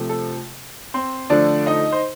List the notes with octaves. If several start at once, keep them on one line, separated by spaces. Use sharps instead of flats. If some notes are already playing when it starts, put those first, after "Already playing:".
Already playing: C3 F3 A3
A4
C4 C5
D3 F3 A3 D4 D5
D#4 D#5
C5